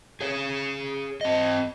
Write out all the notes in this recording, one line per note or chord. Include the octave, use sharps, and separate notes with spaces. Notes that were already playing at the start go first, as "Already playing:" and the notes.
G#4 C#5
C4 D#5